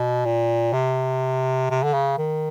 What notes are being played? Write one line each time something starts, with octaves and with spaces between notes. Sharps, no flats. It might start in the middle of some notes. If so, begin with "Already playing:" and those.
Already playing: B2
A#2
C3
C3
D3
C#3
D#3